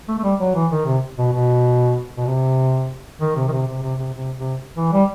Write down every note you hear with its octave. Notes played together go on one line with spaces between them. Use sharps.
A3
A3
G3
F#3
E3
D#3
C3
B2
B2
B2
C3
D#3
C3
D#3
C3
C3
C3
C3
C3
C3
E3
G3